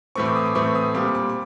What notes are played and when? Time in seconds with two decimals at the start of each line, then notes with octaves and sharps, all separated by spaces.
0.15 A2 E3 A3 C4 C#6
0.25 D6
0.36 D#6
0.46 D6
0.55 A2 E3 A3 C4 C#6
0.75 D#6
0.94 A#2 G3 C4 D6
1.15 D6
1.29 D6